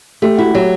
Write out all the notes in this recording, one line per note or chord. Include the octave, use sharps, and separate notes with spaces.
A3 G4
E4 F#4
F#3 G4